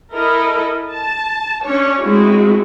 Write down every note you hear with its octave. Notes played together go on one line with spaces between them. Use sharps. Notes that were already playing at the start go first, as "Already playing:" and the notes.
E4 A4 A#4 D#5
A5
C#4 D4 C#5
G#3 A3 C4 E4 F#4 G#4